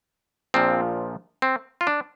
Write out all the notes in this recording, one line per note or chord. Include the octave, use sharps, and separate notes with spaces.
A#1 A#2 F3 C4
C4
F4
D4